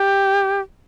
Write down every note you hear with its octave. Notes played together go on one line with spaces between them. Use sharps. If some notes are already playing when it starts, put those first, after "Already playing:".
Already playing: G4